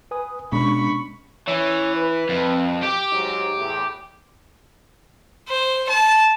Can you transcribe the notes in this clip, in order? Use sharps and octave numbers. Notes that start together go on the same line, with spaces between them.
B4 G#5 D#6
B2 G#3 C#4 D4 B5 C#6
E3 C#4 C#5
B4
F2
G4
G#2 F#3 D#4
E2 A2
C5
A5